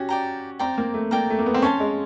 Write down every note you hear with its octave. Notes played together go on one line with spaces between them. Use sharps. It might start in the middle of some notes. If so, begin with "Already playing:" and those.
Already playing: C#4 F#4 G4
D5 G5 A#5
C4 D5 G5 A#5
A#3
A3
A#3 D5 G5 A#5
A3
A#3
B3
C4
C#4 C#5 F5 A5 C6
G#3